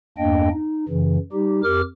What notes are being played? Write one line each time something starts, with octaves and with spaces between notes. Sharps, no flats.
E2 G2 A#3 D4 D#5 G5
D#4
F#2 C#3 E3
G3 D#4 G4
F2 G4 A#4 D6 F6